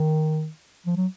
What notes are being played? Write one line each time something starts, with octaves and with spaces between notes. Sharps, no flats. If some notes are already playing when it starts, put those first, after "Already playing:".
Already playing: D#3
F3
F#3